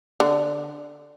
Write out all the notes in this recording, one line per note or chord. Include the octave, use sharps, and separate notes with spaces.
D3